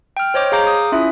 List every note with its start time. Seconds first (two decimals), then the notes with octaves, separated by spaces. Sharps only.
0.17 G5 F6
0.34 C5 C#5 D#5 D6
0.52 G#4 F5 A#5 D6 G6
0.67 D#6
0.92 C#4 E4 F4 E5